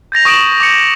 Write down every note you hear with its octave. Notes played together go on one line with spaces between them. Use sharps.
G6 A6 A#6 F7
C#6 D#6 D7 E7 F#7
D6 C#7